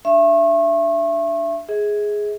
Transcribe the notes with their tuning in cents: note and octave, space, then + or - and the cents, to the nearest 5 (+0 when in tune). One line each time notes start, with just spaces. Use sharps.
D4 +0 E5 +25 C#6 -35
G#4 +0 E5 -40